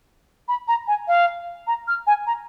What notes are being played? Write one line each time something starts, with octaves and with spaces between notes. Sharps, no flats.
B5
A#5
G#5
F5
A#5
F6
G#5
A#5